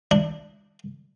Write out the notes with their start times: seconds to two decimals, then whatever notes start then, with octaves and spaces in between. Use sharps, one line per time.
0.11 D4